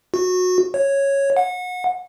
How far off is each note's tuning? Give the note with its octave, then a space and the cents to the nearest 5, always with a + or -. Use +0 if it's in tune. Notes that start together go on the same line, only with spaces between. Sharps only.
F#4 -20
C#5 -5
F#5 -30